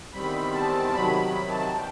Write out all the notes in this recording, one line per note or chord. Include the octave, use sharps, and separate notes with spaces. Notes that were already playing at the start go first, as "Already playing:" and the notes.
E2 D#3 G3 C4 B5
A5
C3 D#3 F#3 B5
B5
A5
E3 G3 G5